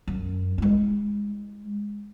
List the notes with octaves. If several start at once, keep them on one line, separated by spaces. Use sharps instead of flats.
F#2
G#3 E4